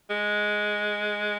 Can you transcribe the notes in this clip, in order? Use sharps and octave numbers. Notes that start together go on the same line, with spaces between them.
G#3